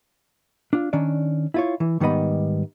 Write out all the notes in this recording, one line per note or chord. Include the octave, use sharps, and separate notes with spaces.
D4 F4
D#3 C#4 D4 D5
E4 F4 C#5
E3
G#2 D#3 G3 B3 D#5 B5